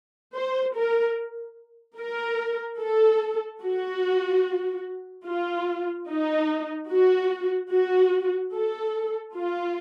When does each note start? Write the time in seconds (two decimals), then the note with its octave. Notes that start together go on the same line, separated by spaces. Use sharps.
0.36 C5
0.76 A#4
1.99 A#4
2.80 A4
3.63 F#4
5.26 F4
6.09 D#4
6.90 F#4
7.72 F#4
8.54 A4
9.36 F4